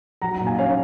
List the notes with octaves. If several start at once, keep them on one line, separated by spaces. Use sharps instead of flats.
F#3 F#5 A#5
F#5 A#5
A#2
F5 G#5
C#4 C#5 F5